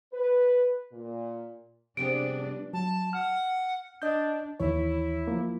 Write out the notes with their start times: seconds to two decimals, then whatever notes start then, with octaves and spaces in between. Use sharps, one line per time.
0.13 B4
0.93 A#2
1.97 C3 F3 G3 B3 C4 D4 G#4 D7
2.73 F#3 A5
3.13 F#5 F6
4.02 D4 D#5 G6
4.60 D#2 E3 E4 C#5
5.27 F3 A#3